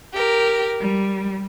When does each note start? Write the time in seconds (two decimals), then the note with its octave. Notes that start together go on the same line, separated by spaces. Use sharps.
0.14 G4 A#4
0.82 G3